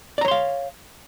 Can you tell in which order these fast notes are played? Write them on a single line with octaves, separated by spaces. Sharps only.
D5 A#5 C#5 C6 F5